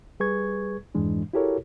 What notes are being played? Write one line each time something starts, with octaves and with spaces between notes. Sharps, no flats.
G3 G#4 B4 C#6 G#6
F2 G#2 E3 G#3 D4
E4 F#4 G4 A4 A#4 C#5